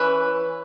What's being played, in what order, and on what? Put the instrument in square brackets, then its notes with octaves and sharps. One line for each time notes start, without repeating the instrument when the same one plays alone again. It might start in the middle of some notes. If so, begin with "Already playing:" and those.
Already playing: [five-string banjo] E3 C#4 B4